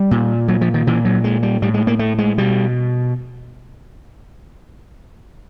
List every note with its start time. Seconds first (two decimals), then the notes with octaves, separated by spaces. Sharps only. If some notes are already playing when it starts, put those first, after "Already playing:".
Already playing: G3
0.11 A#2
0.48 F#3
0.61 F3
0.74 D#3
0.87 A#2 E3
1.05 F#3
1.24 G#3
1.43 G3
1.62 A2 G3
1.74 G#3
1.87 A#3
1.99 A3
2.18 G#3
2.38 B2 G3